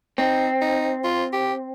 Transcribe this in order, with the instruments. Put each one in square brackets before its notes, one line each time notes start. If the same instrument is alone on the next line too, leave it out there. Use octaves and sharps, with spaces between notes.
[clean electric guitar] C4 [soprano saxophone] D#4
[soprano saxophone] D#4
F4
G4